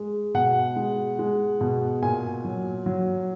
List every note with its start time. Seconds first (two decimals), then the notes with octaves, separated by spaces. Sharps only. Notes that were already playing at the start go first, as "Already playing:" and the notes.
Already playing: G#3
0.34 B2 F#5
0.76 G#3
1.19 G#3
1.61 B2
2.02 A#2 G#5
2.45 F#3
2.86 F#3